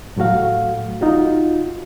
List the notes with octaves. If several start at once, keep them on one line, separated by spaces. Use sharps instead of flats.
A2 F#3 A3 F#4 F5
D#4 F4 F#4